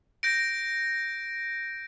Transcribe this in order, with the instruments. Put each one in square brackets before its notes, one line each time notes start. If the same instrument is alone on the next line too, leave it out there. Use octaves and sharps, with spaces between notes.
[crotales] G6 A#6 D7